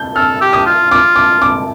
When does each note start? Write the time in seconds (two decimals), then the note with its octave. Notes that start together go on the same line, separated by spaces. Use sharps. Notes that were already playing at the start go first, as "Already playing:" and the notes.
Already playing: G6
0.16 A4 F6
0.41 G4
0.53 D#6
0.66 F4
0.91 F4 D6
1.16 D6
1.42 D6